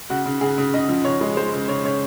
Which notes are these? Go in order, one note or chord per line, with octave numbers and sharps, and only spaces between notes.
C#3 F#4
C#3
C#3 G#4
C#3
C#3 D#5
F3
C#3 C#5
G#3
G#3 C5
C#3
C#3 C#5
C#3 C#5